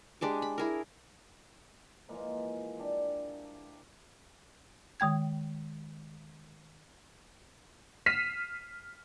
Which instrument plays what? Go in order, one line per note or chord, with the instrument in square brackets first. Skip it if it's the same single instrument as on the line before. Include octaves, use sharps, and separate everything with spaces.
[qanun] G#3 D4 G4 D6
B5
E4 G#4 A#4
[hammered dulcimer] E3 F3 G#3 A#3
D4 G4
[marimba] D#3 G#3 G5 G#6
[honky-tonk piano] F6 B6 C7 D#7 E7